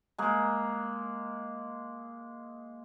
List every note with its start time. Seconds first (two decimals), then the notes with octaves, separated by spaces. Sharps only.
0.18 G#3 A#3